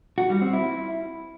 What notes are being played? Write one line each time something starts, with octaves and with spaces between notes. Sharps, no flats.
F#4
G3
C4
E4